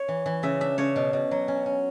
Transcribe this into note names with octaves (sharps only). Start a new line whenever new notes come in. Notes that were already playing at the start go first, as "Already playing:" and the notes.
Already playing: C#5
E3
E3
C#3 E5
D4 E5
C#3 C#5
B2
B2
F#3
C#4
C#4